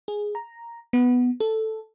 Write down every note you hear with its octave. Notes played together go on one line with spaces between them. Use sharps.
G#4
A#5
B3
A4